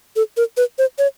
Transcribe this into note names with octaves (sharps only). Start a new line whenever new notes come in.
A4
A#4
B4
C5
C#5